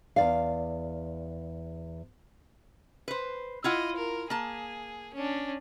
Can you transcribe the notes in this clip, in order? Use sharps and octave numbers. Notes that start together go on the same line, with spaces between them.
E2 D5 F5
B4 C5
E4 F4 D#5 F#5
A#4
A#3 G#4 A5
C#4 D4